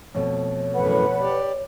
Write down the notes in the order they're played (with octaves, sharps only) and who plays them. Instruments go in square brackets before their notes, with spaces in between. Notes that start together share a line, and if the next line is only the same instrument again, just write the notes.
[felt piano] F2 B2 A3 [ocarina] C#5
[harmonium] F#2 A2 E3 [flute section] B4 F#5 B5
[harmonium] G4 D5